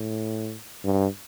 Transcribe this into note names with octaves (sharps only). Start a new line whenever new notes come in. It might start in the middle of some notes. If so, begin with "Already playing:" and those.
Already playing: A2
G2